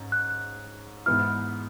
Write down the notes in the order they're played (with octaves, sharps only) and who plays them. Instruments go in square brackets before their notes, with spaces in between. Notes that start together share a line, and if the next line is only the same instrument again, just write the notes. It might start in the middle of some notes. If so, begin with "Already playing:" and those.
Already playing: [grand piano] G#2 C#4
[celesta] F#6
[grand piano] G#2 E3 G#3 B3 E4 [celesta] F6